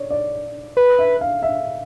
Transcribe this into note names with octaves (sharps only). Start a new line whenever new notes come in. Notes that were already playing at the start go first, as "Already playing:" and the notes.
Already playing: C#5 D5
D5
B4
E5
F5
E5